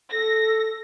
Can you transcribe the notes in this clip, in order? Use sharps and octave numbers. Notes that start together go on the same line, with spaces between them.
A4 A#6